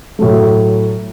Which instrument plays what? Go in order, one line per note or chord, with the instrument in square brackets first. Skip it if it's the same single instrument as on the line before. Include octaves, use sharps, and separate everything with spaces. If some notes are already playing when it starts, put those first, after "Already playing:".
[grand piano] A2 F#3 A3